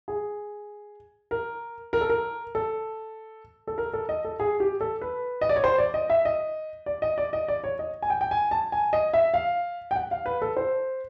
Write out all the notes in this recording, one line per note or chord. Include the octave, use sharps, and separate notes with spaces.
G#4
A#4
A#4
A4
A#4
A4
A4
A#4
A4
D#5
A4
G#4
G4
A4
B4
D#5
D5
C#5
C5
D5
D#5
E5
D#5
D5
D#5
D5
D#5
D5
C#5
D#5
G#5
G5
G5
G#5
A5
G#5
D#5
E5
F5
G5
F#5
F5
B4
A4
C5